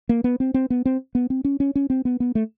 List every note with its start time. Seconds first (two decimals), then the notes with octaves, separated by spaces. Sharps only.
0.09 A#3
0.24 B3
0.40 C4
0.54 C4
0.70 B3
0.85 C4
1.15 B3
1.30 C4
1.45 C#4
1.60 C#4
1.75 C#4
1.90 C4
2.05 B3
2.20 B3
2.35 A3